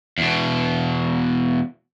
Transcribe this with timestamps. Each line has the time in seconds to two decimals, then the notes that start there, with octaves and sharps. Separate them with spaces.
0.18 E2 B2